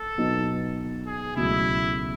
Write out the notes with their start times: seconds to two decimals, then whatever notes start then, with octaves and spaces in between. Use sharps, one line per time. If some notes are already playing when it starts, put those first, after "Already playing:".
Already playing: A4
0.18 B2 F#3 B3 D#4
1.07 G#4
1.36 C#2 B2 F#3 A3 E4